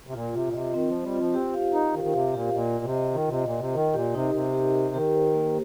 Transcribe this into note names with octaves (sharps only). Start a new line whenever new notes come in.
C3
A#2 F4
C3 F4
A#2
C3 D#5
D#3 C4
F3 C5
G3
F4
F3
C4 G4
F5
D#4 A#4
D#3 A#4
D#3
C3 F5
A#2 G4
A#2 D#5
D#5
C3
D#5
D#3 F4
C3 D#5
A#2
D#5
C3
D#3 A#4
A#2 G4
C3 D#4
C3 A#4
G4
A#4
D#3 G4
C5
A#3